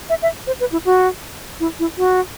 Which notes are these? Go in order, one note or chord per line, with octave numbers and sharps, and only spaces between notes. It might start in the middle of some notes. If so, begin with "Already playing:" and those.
E5
E5
C5
B4
E4
F#4
E4
E4
F#4